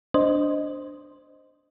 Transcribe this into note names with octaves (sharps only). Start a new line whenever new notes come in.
D4 C5 D#5